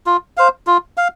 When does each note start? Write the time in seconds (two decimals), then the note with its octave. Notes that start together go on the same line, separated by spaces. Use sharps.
0.06 F4
0.37 C5 F5
0.67 F4
0.97 F5